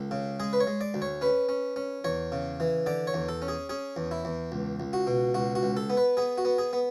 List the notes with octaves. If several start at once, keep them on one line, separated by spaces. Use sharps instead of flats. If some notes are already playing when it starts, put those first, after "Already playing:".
Already playing: C#2 A4
C#3
G#3 G#4
B4
C#5
G#3
D5
D2
C#5
C#4 B4
C#4
C#4
E2 C#5
C#3
E3
D3 D5
C#5
E2
A4
C#4
G#4
C#4 G#4
E2
E4
E2
C#2
C#2
F#4
B2
C#2 F#4
F#4
C#2
A4
B3
B4
B3 G#4
F#4
B3
G#4
B3